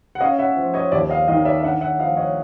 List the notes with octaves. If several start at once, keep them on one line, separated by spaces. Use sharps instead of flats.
F#5
C#4 D#5 F5
E5 F#5
F3
C#5 D#5
D#2 D5 E5
D#5 F5
D#3 D#5 F5
D5 E5
D4 E5 F#5
E5 F#5
F3 D#5 F5
C#5 D#5